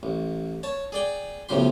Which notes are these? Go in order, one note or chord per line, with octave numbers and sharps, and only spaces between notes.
A1
C#5 A5
G#4 D5 G5
B1 A2 C#3 F3 G4 C6